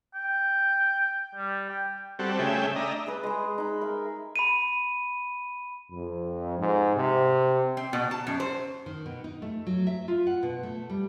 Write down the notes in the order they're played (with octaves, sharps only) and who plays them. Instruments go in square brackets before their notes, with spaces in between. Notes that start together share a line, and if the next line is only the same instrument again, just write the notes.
[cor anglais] G5
G3
G5
[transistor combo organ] G3 C4 F#4 A4
C#3 A3 G#4 E5 G5
D4 D#5 E5 A#5
[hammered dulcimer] G#4 B4
G#3 G#4
D#4 B5
A#4 E5
[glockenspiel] B5 D#7
[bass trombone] F2
G#2
C3
[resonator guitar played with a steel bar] C4
B2
A5
F#2
C5
[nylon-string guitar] D#3
B2
D#4
A3
F#3
E5
F4
F#5
B2
A3
G3